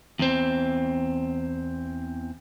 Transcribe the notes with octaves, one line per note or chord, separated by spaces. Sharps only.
E2 C4